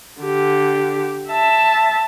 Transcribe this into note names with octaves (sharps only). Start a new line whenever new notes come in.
D3 G4
E5 A5